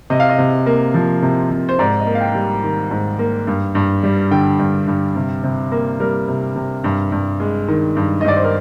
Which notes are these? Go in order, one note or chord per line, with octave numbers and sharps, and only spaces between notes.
C3 D#5
F5
D#5
C3
A#3
F3
C3
C3
C5
G#2 D5
D#5
A#3
F5
G5
G3
D#3
G#2
A#3
G2
G2
G3
D3 G5
G2
G2
C3
C3
A#3
G3 A#4
C3
C3
G2
G2
G#3
D#3
G2
D#5
G2 D5
C5
A#4